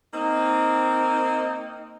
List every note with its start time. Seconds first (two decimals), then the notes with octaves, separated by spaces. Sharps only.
0.13 A#3 C4 D#4